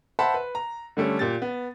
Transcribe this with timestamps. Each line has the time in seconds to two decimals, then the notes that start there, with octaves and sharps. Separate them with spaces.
0.19 C5 E5 F#5 A5 B5 C6
0.34 B4
0.55 A#5
0.97 D3 G3 A3 C#4
1.19 A#2 G4 A6
1.42 B3